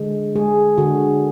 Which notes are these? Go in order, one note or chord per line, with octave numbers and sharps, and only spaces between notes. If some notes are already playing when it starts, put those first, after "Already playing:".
Already playing: D3 G#3
G#3 G#4
D3 F#4